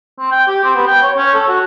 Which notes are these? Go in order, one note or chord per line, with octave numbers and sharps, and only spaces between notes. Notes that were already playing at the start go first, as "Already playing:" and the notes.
C4
G5
G4
C4
B3
G5
C#5
C#4
A4
F#4